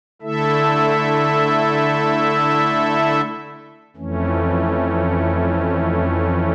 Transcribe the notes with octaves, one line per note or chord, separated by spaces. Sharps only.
D3 A3 E4 A4 E5
F2 E3 A3 C#4